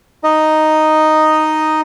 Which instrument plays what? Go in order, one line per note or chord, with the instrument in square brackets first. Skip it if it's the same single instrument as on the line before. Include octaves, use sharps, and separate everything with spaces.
[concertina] D#4 D#5